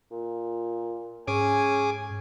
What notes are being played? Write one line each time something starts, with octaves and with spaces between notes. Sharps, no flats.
A#2
G#2 C#4 G#4 G#5 D6